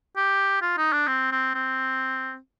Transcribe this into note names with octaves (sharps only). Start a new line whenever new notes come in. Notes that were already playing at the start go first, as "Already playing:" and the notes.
G4
F4
D#4
D4
C4
C4
C4